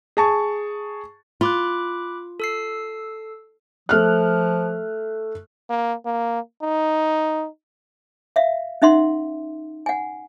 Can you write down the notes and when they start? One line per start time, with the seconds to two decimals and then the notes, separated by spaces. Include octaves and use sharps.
0.17 G#4 A5 C#6
1.41 F4 B5 D6 F#6
2.40 A4 E6 C7
3.89 F3 A3 F6 F#6
5.69 A#3
6.06 A#3
6.62 D#4
8.36 E5 F5
8.82 C#4 D#4 E5 F#5 C6
9.86 F#5 G#5